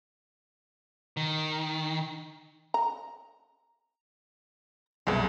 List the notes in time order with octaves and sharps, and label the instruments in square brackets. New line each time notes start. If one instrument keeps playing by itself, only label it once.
[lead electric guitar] D#3
[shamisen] A#5
[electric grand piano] C2 F#2 B2 [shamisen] F3 G#3 E4